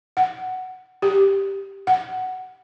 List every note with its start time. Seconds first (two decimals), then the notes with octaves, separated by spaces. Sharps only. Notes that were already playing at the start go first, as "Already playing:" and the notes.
0.17 F#5
1.02 G4
1.87 F#5